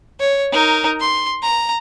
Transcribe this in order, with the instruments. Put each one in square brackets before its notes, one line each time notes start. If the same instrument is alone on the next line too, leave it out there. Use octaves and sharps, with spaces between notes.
[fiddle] C#5
D#4 A#4
C6
A#5